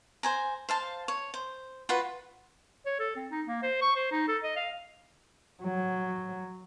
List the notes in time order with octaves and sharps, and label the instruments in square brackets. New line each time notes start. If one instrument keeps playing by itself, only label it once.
[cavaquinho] C5 G#5 A#5
C5 F5 A5
C#5
C5
F4 F#4 B4
[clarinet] C#5
A4
C4
D#4
A#3
C5
C#6
C5
D#4
A4
D#5
F5
[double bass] F#3